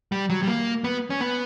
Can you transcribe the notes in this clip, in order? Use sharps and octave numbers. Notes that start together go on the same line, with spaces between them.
G3
F#3
G3
A#3
B3
C#4
B3